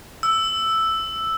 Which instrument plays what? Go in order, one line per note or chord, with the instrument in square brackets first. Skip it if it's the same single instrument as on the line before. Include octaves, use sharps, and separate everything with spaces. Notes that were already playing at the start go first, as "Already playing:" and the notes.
[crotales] E6